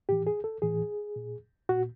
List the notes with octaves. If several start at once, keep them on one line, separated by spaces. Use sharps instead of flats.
A2 E3 G4
G#4
A4
A2 E3 G#4
A#2
A#2 F#4